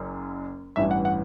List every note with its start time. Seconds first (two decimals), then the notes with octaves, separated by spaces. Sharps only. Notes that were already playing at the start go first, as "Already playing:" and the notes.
Already playing: F#1 F#2
0.76 A1 G2 E3 E5
0.91 F#5
1.05 F#5